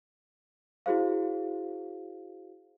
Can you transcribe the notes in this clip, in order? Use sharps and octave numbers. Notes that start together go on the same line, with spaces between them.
E4 F#4 G#4 C5 F5